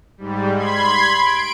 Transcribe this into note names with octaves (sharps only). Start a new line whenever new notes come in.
G#2 G3
B5 C6 G#6
D7